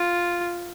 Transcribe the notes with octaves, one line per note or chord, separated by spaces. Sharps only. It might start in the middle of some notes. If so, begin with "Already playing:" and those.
Already playing: F4